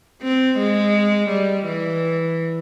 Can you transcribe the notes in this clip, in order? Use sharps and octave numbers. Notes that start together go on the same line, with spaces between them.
C4
G#3
G3
E3